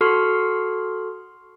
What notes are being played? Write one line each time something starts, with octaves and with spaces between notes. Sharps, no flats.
F#4 A4 C6 C#6 F6 C7